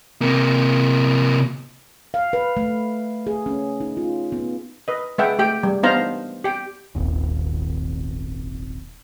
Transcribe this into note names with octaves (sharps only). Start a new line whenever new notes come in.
C3 A#3
F5
B4
A3
G#4
C#4
D#4
F4
B3
B4 D#5
G#3 B4 E5 F#5 G5
A3 G4 G5
G3
B3 D4 D#4 C5 F5 A#5
G4 G5
D#1 G#1 D#2